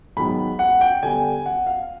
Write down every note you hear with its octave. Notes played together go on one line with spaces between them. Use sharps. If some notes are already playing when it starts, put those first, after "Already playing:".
G#2 D#3 F#3 B3 B5
F#5
G5
D3 G3 B3 G#5
F#5
F5